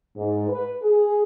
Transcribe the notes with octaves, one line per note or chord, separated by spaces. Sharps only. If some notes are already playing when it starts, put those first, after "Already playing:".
G#2
B4
G#4